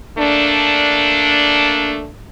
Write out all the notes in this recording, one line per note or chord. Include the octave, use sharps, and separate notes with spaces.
A3 A#3 D4